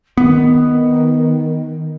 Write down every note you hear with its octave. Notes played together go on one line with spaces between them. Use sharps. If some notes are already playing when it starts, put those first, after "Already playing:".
D#3 B3